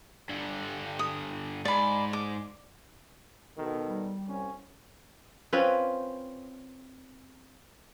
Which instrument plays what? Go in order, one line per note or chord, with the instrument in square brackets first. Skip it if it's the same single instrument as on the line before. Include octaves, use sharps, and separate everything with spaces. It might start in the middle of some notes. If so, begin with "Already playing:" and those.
[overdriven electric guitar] G2 D3
[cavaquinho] D#6
[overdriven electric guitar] G#2 [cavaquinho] D5 B5
[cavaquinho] D6
[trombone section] B2 D#3 A4
[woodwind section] G3
[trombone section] C2 C#4
[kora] C4 C#4 F4 B4